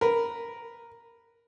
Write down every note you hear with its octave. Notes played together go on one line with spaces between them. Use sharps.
A#4 B4